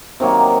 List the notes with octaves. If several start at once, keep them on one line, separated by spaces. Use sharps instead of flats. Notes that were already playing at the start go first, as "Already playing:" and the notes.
C3 D#3 F#3 A#3